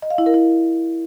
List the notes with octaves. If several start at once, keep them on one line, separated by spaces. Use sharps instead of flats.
D#5
F5
E4
A#4
E4